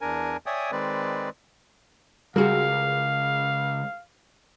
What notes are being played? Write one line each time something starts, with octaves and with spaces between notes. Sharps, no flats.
E2 D4 A#4 G#5
C#5 D5 E5 G5 G#5 D#6
D#3 G#3 C4 B4 D5
C#2 G3 F#4 G#4 A#4 F5